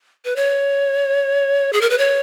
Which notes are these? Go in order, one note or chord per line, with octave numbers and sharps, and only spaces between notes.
B4
C#5
G#4
A#4
B4
C#5